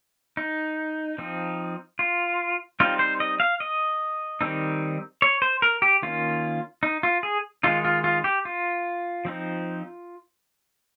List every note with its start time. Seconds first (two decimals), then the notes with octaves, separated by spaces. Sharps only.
0.37 D#4
1.18 F3 C4 D#4
1.99 F4
2.80 G3 C4 D#4 F4
2.99 C5
3.20 D#5
3.40 F5
3.60 D#5
4.41 D#3 G3 C4 D#4
5.22 C#5
5.42 C5
5.62 A#4
5.82 G4
6.02 D#3 A#3 C#4 F4
6.83 D#4
7.03 F4
7.23 G#4
7.63 D#3 G#3 D#4 F4
7.85 F4
8.04 F4
8.24 G4
8.45 F4
9.25 F3 C4 D#4